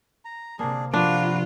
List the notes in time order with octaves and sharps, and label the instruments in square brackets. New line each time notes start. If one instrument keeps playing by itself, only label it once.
[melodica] A#5
[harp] C3 A#3 [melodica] D4 G#4
[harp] F3 [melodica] A#3 F#4 B4 [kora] D4 [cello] F4